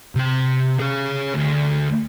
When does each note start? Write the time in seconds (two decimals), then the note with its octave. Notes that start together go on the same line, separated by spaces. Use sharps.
0.15 C3 G5
0.80 G#4 C#5
1.34 D2